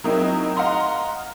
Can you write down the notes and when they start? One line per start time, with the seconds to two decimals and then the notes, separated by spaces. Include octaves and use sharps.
0.04 F#3 A#3 C4 D#4 E4
0.57 D#5 F5 F#5 A#5 C6